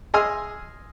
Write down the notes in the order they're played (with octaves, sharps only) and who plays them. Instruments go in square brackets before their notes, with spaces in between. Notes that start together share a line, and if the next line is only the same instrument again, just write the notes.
[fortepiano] G#4 D#5 G#5 C6 E6 F6